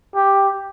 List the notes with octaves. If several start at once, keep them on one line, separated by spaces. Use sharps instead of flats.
G4